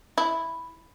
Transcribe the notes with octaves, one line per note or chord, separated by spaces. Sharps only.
E4